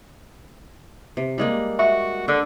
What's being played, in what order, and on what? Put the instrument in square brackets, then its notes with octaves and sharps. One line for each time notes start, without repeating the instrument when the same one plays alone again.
[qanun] C3
G3 G#3 A#3
[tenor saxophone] F#4 [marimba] E5
[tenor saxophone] D3 [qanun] D4